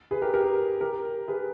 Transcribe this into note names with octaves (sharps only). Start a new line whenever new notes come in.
G#4 B4
G4 A#4
G4 A#4
G4 A#4
G#4 B4